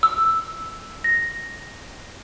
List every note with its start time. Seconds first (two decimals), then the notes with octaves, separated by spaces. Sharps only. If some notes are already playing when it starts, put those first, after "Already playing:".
0.03 E6
1.04 A#6